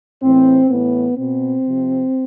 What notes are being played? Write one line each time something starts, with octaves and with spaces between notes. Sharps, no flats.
A2 E3 C4
A2 E3 B3
B2 C4
C3 F3